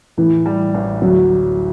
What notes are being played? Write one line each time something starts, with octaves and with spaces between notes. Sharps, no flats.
A2 E3
G3
A1
D2 F#3